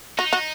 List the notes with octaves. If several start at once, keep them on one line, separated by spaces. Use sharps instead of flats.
D#4 F#4
F#4